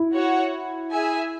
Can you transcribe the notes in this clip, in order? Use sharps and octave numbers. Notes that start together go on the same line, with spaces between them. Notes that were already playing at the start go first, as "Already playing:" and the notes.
Already playing: E4
F#4 C#5 F#5
G#4 E5 G#5